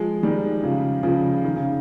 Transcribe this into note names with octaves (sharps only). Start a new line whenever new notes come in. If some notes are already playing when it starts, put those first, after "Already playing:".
Already playing: F3 G#3
D#3 G3
C#3 F3
C#3 F3
D#3
C#3